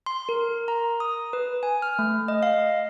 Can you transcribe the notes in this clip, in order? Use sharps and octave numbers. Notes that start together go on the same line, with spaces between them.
C6
A#4
A#5
D#6
B4
G#5
F6
A3
D#5
F5